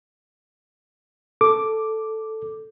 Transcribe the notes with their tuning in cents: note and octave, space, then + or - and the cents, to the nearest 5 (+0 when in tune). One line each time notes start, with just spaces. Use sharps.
A4 +0 D6 +0